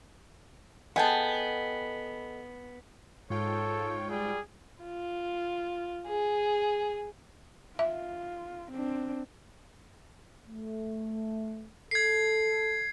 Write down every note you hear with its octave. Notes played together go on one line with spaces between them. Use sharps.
B3 G#4 A4 D#5 F#5 G5 A5
G#2 F4 A4 C#5 G5
G3 G#4
F4
G#4
F4 E5
C4 D4
A3
A4 G#6 C7